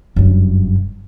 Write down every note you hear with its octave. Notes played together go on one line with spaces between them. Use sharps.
F#1 G2